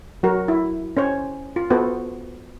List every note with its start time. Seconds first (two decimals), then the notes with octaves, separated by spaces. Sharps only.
0.23 F#3 F#4 A#4
0.48 E4
0.97 C#4 C5 C#5
1.56 F4
1.70 B3 F4 F#4 A4 B4 C5